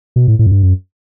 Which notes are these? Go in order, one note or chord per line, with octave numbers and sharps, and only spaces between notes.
B2
A2
A2
F#2
G2
F#2